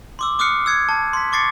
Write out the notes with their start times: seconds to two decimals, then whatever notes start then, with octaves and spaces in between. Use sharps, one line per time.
0.19 C6 D6 E6
0.39 D6 D#6 F6 F#6 C7 C#7
0.66 E6 F#6 G#6 C#7
0.89 A5
1.13 C6 B6
1.32 C#6 D6 A6 C7 C#7